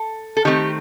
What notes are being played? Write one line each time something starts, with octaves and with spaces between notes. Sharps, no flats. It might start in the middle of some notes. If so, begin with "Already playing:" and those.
Already playing: A4
A4
D#3 A3 C4 G4